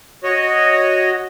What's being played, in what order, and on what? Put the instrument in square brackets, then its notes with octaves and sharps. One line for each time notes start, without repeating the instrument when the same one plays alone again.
[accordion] F#4 C#5 D#5